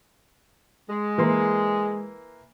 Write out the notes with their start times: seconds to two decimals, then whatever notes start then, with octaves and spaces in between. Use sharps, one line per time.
0.90 G#3
1.18 E3 A#3 C6